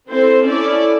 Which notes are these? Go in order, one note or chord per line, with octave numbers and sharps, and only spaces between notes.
C4 E4 A4 C5
C#4 E4 A4 D5